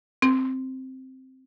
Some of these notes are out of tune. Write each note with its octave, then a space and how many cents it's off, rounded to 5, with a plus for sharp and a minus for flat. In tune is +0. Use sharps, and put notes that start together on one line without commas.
C4 +0